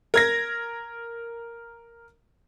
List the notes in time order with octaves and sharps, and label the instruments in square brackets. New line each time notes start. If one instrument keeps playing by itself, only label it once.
[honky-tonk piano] A#4 G#6 A#6